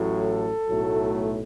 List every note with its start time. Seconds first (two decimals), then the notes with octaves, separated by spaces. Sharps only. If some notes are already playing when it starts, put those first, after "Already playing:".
Already playing: A1 A2 F#3
0.19 A4
0.69 B1 A2 F#3 A3